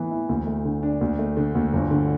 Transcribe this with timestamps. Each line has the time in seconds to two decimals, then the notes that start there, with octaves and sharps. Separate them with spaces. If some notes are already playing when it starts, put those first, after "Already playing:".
Already playing: A2 E3 B3
0.11 E4
0.29 D2
0.47 A3
0.65 D3
0.83 D4
1.01 D2
1.19 A3
1.37 D3
1.55 D2
1.73 G1
1.91 D3